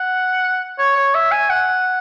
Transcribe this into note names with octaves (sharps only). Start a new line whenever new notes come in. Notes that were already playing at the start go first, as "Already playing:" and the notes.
Already playing: F#5
C#5
C#5
E5
G#5
F#5